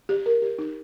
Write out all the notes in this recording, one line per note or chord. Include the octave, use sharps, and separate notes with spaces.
G4
A#4
G4
D#4